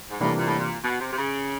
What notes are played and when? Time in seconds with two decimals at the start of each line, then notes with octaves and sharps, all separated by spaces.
0.10 G#2
0.20 A2 C3 E3 G3 A#3 D4
0.37 A#2
0.47 A2
0.59 A#2
0.84 B2
1.00 C3
1.12 C3
1.17 C#3